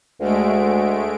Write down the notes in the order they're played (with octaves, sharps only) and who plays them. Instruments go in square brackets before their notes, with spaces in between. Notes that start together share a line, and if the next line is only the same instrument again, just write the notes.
[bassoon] D2 [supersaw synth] G#3 A3 D7